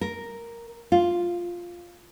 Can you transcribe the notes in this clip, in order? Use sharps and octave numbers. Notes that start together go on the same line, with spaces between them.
A#4
F4